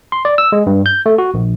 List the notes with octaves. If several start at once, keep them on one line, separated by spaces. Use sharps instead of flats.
C6
D5
E6
G#3
G2
G6
A3
F#4
A#1